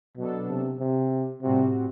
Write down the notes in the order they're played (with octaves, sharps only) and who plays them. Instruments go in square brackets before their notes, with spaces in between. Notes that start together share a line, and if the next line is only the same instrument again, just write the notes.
[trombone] B2 [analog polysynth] F#3 B3 D4 A4
[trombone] C3
C3
[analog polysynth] A2 G3 C4 F#4 [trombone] C3